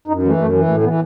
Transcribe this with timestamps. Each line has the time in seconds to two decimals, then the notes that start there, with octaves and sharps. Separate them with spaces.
0.08 F#2 D#4
0.23 E3 A3
0.37 F#2 A3
0.53 E3
0.68 A2 A3
0.84 E3 B3